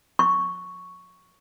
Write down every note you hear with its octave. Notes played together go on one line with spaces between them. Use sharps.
C#6